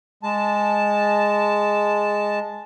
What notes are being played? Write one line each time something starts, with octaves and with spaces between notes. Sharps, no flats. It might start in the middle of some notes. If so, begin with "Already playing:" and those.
G#3 A5